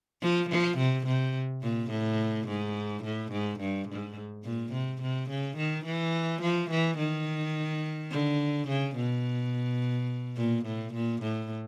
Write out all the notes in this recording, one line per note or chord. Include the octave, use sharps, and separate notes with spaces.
F3
F3
C3
C3
A#2
A2
G#2
A2
G#2
G2
G#2
A#2
C3
C3
C#3
D#3
E3
F3
E3
D#3
D3
C#3
B2
A#2
A2
A#2
A2